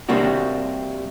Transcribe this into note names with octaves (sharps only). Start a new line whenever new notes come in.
C3 G3 A#3 D4 F#4